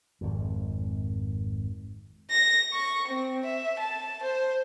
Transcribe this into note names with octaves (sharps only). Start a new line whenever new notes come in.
G#1 F2
A#6
C#6
C4
E5
A5
C5